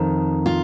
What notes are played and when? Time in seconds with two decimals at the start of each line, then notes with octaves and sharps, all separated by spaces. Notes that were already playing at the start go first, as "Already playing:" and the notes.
Already playing: F2 D#3
0.46 F4